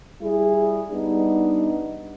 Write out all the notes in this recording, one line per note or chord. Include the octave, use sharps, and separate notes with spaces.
G3 E4 G#4
G3 B3 D4 D#4